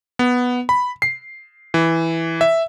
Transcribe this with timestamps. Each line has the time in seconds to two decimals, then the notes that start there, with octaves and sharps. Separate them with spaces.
0.19 B3
0.69 B5
1.02 C7
1.74 E3
2.41 E5